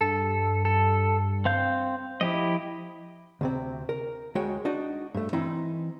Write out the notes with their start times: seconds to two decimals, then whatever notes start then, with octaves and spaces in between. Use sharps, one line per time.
0.01 G2 A4
0.65 A4
1.45 C4 F5 G6
2.21 F3 E4 G4 D#5
3.41 D2 C3 C4
3.89 A#4
4.35 D2 G#3 F#4 C#5 G5
4.65 D4 D#4 F#4 D#5
5.14 G2 A3
5.33 E3 C4 D#4 E4 C6